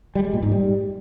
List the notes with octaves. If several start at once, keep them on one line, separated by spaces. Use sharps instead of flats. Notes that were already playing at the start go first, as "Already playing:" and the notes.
G3
G#3
A#2
G#2
G3